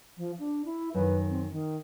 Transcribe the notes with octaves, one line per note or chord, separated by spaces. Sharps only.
F3
D4
E4
F#2 D#3 B4
C4
D#3